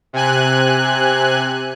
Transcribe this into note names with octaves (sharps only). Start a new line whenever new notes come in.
C3 G#5 F#6